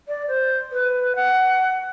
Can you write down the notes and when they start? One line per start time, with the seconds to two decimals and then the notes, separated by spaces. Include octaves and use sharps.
0.08 D5
0.28 C5
0.72 B4
1.16 F#5